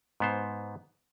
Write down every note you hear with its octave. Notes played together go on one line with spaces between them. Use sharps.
G#2 B3 C5